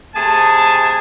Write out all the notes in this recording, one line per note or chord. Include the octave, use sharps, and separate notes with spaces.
C3 A3 G#4 G#5 A5